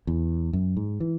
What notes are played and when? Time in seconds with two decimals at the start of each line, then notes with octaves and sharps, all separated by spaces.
0.07 E2
0.53 F#2
0.77 G#2
1.00 E3